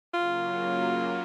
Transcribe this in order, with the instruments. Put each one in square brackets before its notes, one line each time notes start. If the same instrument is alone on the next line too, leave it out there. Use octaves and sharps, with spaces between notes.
[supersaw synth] C#3 F#3 A#3 [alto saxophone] F4